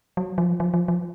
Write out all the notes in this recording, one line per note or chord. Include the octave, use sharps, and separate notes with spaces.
F#3
F3
F3
F3
F3